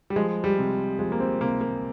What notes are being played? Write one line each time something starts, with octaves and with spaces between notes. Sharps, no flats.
G3
F3 G#3
G3
C3
F3 G#3
A#3
C4
C3 A#3
A#3